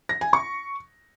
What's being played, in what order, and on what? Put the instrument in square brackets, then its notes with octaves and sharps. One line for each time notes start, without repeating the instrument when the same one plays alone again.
[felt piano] A#6
G#5
C#6